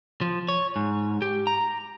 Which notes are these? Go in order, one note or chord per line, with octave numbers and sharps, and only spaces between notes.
F3
C#5
G#2
G4
A#5